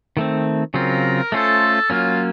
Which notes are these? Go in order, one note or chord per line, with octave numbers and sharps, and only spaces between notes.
D#3 A3 C4
C#3 F#3 C4 F4 A#4
A3 C#4 F4 A4 C5
F#3 A#3 C#4 F4